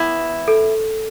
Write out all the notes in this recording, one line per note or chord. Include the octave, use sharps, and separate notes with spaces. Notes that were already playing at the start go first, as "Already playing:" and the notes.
Already playing: E3 B3 E4
A4